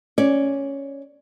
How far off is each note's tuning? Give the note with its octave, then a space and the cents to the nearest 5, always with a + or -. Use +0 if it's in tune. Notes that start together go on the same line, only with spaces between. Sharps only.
C#4 +0 D5 -5